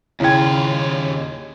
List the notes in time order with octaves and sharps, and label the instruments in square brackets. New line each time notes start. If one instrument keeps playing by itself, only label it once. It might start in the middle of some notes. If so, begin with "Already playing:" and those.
[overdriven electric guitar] D#2 F4 [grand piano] C#3 G#6 [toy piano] E4 G5